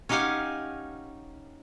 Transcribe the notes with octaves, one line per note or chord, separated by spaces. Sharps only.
C#4 D#4 G4 F5 F#5 G#5